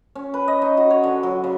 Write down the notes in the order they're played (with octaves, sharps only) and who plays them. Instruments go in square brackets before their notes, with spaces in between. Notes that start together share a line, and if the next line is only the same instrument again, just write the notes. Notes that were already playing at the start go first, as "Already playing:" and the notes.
[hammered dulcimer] C#4
B4
D#5
D#4
F#4
C#5
D3
F#3
C#3